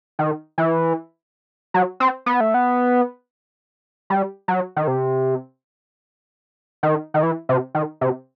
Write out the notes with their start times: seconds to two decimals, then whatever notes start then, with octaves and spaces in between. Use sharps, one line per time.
0.19 D#3
0.58 E3
1.74 F#3
2.00 C4
2.26 B3
2.41 A3
2.54 B3
4.10 G3
4.48 F#3
4.76 D#3
4.87 C3
6.83 D#3
7.14 D#3
7.23 E3
7.49 C3
7.75 D#3
8.01 C3